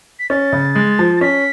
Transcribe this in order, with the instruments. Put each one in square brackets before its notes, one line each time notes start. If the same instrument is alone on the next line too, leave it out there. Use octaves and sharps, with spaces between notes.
[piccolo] B6
[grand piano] C#4 [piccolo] A6
[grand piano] C#3
G#3
F3
[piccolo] A6
[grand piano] C#4 [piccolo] B6